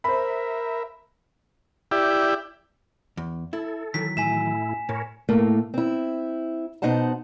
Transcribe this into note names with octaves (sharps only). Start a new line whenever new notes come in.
A#4 C5 E5 B5
E4 G4 D5
E2
E4 A4
D#3 E3 F#3 B6
A2 E4 G#5 B6 E7
A2 A#4 C#5
A2 A3 A#3
C4 E4
B2 D#4 C5 F#5 A5